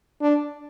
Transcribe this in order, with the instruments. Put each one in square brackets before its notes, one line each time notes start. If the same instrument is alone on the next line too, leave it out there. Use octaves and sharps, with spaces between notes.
[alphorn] D4